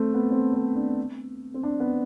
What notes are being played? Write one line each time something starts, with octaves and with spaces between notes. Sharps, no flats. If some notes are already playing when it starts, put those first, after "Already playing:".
Already playing: A3 C4
B3
C4
C4
D4
C4
D4
B3